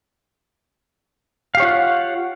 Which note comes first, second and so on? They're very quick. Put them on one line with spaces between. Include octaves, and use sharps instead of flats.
F5 G4 C#5 F4 F#5